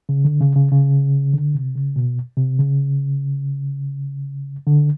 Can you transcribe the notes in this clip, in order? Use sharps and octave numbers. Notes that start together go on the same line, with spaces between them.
C#3
D3
C#3
C#3
C#3
D3
C3
C#3
B2
C3
C#3
D3